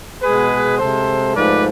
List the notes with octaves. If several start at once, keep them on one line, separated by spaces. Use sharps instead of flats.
B2 G#3 G#4 B4
C3 G#3 A4 C5
G#2 F3 A3 B4 D5